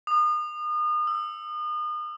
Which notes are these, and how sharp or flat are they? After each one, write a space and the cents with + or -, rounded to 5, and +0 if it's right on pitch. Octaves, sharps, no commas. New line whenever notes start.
D#6 -35
E6 +0